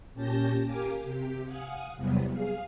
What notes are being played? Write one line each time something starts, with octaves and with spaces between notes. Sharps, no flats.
A#2 C#4 G4 A5 G6 A#6
G4 A#4 F5 G#5 D6
C3 G4
F5 F#5 G#5 D#6
E2 C3 F#3 G3 B3
G#4 F5